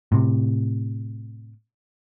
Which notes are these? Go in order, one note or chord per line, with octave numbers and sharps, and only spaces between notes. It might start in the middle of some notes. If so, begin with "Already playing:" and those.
A2 C3